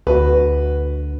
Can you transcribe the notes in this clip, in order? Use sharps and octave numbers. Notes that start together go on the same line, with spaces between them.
D2 F#4 B4